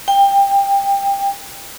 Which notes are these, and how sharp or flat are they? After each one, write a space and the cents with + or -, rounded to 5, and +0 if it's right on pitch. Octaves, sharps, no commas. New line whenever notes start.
G5 +20